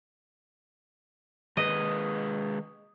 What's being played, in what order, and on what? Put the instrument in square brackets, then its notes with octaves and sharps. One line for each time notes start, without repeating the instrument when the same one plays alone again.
[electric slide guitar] D#3 G#3 B4 [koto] D#5